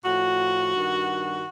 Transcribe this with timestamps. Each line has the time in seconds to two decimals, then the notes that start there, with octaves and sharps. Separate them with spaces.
0.05 A2 F3 F#4
0.74 G2 D#3